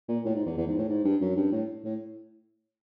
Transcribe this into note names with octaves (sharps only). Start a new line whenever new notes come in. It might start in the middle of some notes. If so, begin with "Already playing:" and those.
A#2
A2
G#2
E2
E2
G#2
A2
G#2
G2
F#2
G2
A2
A2